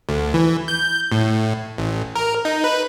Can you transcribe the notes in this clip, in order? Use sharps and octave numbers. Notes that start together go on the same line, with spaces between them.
D2
E3
G6
A2
A1
A#4
D#4
B4